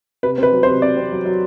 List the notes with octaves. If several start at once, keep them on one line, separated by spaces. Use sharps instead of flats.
C3 B4
C4 B4
F#3
C5
C3
C4 D5
C4
F#3
F#3